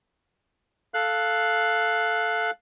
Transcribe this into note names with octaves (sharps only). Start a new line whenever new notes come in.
A4 F5 F#6